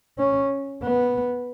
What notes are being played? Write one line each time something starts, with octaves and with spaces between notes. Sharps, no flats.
C#4
B3